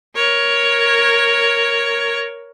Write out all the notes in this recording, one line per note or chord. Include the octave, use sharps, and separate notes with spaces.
A#4 C#5